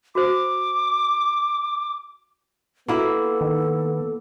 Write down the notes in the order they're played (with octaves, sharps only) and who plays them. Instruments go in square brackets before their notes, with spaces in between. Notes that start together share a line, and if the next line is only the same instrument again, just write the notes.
[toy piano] F#4 C5 [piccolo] D6
[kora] A#3 E4 E5 [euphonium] B3 [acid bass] F#4 [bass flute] A4
[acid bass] D#3